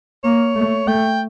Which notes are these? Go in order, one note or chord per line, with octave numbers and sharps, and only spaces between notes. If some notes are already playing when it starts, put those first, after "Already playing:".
A#3 C#5
A3
A3 G5